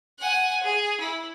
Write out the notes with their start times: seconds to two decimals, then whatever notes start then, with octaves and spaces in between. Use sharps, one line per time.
0.19 F#5 G#5
0.63 G#4
1.00 E4